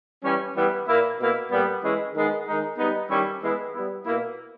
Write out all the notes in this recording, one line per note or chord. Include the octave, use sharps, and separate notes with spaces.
E3 G3 C#4
E3 G3 B3 E4
A#2 A#3 E4
B2 A#3 E4
A#2 G3 B3
E3 G#3 C#4 E4
D#3 G#3 B3
D#3 G#3 D#4
G3 B3 D#4
D#3 G3 C#4 E4
E3 G#3 B3 E4
G3 B3 E4
B2 A#3 E4